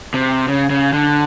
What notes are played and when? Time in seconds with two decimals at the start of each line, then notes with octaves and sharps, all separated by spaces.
0.14 C3
0.48 C#3
0.70 C#3
0.93 D3